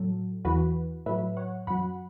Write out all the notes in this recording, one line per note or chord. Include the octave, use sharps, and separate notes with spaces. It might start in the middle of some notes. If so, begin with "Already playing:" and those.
Already playing: A2 F#3 A4
E2 E3 F#4 B4
A2 F#3 B4 E5
C#5 F#5
F#2 F#3 F#5 B5